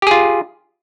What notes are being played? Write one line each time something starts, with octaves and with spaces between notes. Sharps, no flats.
F4 G4 G#4